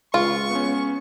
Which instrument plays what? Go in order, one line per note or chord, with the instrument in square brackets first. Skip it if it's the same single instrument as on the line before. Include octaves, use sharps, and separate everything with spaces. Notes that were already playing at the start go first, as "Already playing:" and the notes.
[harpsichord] C#2 [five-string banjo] F4 [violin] C#6
[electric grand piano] B3 C#4